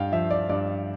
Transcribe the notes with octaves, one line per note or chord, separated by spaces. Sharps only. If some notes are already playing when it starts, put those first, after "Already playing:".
Already playing: G2 F5 G5
F3 E5
D5
G2 D5